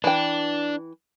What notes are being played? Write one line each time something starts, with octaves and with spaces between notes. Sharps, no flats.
E3 D4 G5